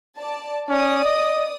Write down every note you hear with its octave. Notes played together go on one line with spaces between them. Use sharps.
D5 A5
C#4 D5 D#6
D#5